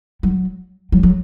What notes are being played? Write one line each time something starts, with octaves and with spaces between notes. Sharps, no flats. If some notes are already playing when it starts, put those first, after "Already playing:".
F#3
F#3
F#3